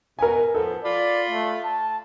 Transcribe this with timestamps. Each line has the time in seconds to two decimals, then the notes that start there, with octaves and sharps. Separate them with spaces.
0.19 B2 A#4 G#5
0.55 F3 B3 A4
0.84 F4 D5 B5
1.30 A3
1.64 A5